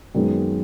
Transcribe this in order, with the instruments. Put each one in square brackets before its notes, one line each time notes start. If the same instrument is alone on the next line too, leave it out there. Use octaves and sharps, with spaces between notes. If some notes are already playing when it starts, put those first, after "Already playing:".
[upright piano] F#2 D#3 G#3 B3